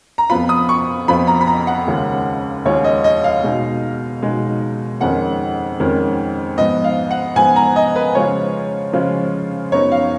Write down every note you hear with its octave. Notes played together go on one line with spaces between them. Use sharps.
A#5
F2 F3 B3 F4 B5
D#6
C#6
F2 F3 B3 F4 B5
A#5
B5
A#5
F#5
D#2 C#3 G#3 C#4 F4
D#2 C#3 G#3 C#4 F4 C#5
D#5
D#5
F5
B2 G#3 D#4
B2 G#3 D#4
F2 D#3 G#3 C#4 F#5
F2 D#3 G#3 C#4
G#2 F3 B3 D#5
F5
F#5
G#2 F3 B3 G#5
A#5
D#5
B4
C#3 F3 G#3 C#4 F4 C#5
C#3 F3 G#3 C#4 F4
F#2 F3 B3 D#4 C#5
F5